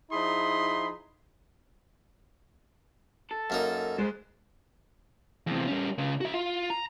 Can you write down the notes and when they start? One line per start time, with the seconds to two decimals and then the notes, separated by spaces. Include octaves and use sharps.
0.11 F3 D#4 E4 G#4 B5 C6
3.31 A4
3.50 F#2 A#3 D#4
3.98 G#3 A4 C5
5.47 E2 C3
5.68 G3 C#4
5.98 C#2 C#3
6.21 F#4 E5
6.34 F4
6.70 A#5